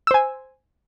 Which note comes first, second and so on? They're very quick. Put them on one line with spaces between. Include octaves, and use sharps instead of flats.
E6 C5 G#5